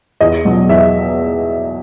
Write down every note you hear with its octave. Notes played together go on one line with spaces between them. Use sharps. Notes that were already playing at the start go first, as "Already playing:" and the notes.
E2 D#5
B2 F#3
E2 E5